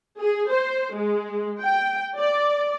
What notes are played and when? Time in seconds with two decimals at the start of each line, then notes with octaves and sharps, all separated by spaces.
0.20 G#4
0.51 C5
0.95 G#3
1.63 G5
2.17 D5